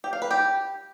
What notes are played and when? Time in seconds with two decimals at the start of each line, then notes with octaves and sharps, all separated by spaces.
0.04 G4
0.13 F5
0.22 B4
0.31 G4